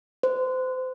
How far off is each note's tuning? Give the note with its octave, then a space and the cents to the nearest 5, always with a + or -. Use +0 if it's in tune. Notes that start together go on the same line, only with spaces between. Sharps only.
C5 -30